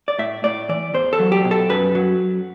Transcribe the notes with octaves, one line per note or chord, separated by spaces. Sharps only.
D5
A2 E5
A2 D5
E3 D5
E2 C5
A4
F#3
G4
B2
A4
F#2 B4
F#3